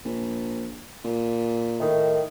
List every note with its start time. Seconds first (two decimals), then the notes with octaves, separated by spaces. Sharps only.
0.05 A#1
1.05 A#2
1.79 A2 D#3